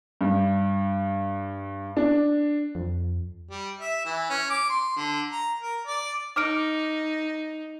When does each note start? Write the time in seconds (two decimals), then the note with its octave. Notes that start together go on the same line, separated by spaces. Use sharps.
0.21 G2
1.97 D4
2.75 F2
3.51 G3
3.79 E5
4.05 E3
4.30 C#4
4.50 D6
4.70 C6
4.96 D3
5.31 A#5
5.60 A#4
5.87 D5
6.36 D#4 D6 F6 D7